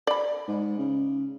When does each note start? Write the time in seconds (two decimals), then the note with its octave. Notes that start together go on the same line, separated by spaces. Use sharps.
0.07 D5 B5
0.48 G#2
0.78 C#3